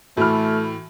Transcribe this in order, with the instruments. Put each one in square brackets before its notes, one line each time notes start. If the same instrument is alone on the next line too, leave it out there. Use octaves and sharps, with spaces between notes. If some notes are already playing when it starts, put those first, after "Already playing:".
[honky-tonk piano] A2 E3 F6 [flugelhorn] A3 [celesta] F#4 B5